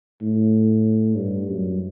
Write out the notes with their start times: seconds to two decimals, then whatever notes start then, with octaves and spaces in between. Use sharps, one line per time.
0.22 A2
1.16 G2
1.49 F#2